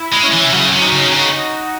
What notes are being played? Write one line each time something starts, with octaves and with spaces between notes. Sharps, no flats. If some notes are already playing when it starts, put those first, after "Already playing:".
Already playing: E4
G#3
C#4
E3
C3
C#3 F#3
C3
D#4
C#3
C#3 F#4